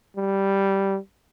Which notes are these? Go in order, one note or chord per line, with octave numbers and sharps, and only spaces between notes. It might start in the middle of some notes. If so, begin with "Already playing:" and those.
G3